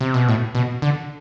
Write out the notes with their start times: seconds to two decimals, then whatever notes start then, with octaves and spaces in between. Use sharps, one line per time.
0.01 C3
0.14 B2
0.28 A2
0.55 B2
0.82 D3